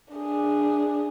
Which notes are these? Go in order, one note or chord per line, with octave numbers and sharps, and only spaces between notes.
D4 G#4